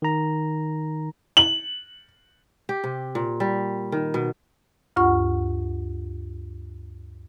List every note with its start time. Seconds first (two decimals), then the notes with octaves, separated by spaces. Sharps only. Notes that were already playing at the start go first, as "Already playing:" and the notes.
0.02 D#3 A#5
1.37 F#7
2.69 G4
2.84 C3
3.15 A#2
3.40 G3
3.92 D#3
4.14 B2
4.96 D2 G2 F4 F#5 C#6